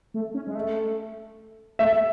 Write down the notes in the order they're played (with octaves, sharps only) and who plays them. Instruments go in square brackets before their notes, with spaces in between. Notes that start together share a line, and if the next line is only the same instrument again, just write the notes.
[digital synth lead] A3
C#4
G#3
A3
[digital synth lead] A3 [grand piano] E5